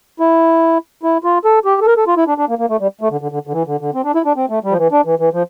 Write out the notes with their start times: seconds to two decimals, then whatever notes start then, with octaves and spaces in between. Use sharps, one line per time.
0.20 E4
1.03 E4
1.24 F4
1.45 A4
1.65 G4
1.81 A4
1.87 A#4
1.97 A4
2.07 F4
2.17 E4
2.28 D4
2.38 D4
2.49 A#3
2.59 A#3
2.70 A3
2.80 G3
3.01 A3
3.11 D3
3.21 D3
3.32 D3
3.47 D3
3.53 E3
3.67 D3
3.81 D3
3.94 C4
4.04 D4
4.15 E4
4.25 D4
4.36 C4
4.49 A3
4.64 G3
4.71 F3
4.78 E3
4.92 D4
5.05 E3
5.20 E3
5.33 F3